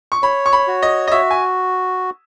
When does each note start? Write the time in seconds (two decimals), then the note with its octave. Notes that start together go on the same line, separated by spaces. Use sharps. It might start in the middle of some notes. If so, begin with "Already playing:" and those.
0.12 C#6
0.23 C#5 B5
0.46 C#6
0.53 B5
0.67 F#4
0.83 D#5
1.07 D#5
1.12 F#4 E5
1.31 G#5